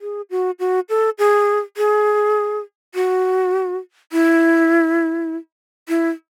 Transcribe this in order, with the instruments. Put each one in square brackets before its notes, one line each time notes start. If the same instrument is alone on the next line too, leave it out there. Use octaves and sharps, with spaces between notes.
[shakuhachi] G#4
F#4
F#4
A4
G#4
G#4
F#4
E4
E4